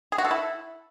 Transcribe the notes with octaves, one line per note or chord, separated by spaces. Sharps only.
G#4
F#4
A4
E4